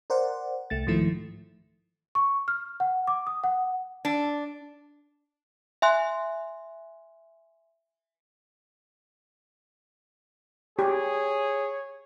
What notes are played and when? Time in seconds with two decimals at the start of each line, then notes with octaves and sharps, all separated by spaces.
0.10 A#4 C5 D5 F#5
0.70 C2 A3 A6
0.87 G#2 D#3 F3 A3 E4
2.15 C#6
2.48 F6
2.80 F#5
3.07 D6
3.27 D#6
3.44 F#5
4.05 D4
5.82 E5 G#5 C6 F#6
10.79 G4 G#4 C#5